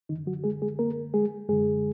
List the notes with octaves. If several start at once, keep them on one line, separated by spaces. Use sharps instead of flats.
F#2 D3 D#3 D#4
F#3 F#4
G#3 G#4
G#3 G#4
A#3 A#4
G#3 G#4
F#2 D3 G#3 G#4